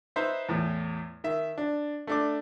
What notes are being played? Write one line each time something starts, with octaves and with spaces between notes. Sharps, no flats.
D#4 B4 C5 E5
E2 A2
D#3 E5
D4
A3 D4 D6